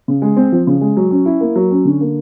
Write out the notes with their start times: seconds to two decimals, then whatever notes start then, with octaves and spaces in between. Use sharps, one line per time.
0.08 C#3
0.22 G#3
0.37 C4
0.52 F3
0.67 C#3
0.81 G#3
0.97 F#3
1.11 C#4
1.26 E4
1.41 A#3
1.56 F#3
1.71 C#4
1.85 D3
2.01 A#3